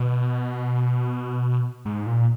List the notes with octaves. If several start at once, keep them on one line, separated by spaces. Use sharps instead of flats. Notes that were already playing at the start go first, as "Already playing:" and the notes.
Already playing: B2
G#2
A#2